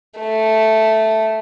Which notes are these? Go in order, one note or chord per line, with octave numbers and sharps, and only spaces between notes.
A3